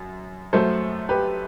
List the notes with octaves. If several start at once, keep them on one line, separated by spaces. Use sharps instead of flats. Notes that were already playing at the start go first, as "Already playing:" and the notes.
Already playing: F#2
F#2 F#3 A3 A4 C5
G4 B4